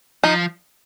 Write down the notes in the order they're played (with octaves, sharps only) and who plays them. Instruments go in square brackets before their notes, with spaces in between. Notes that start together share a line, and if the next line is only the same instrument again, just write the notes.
[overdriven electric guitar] F3 [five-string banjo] D#4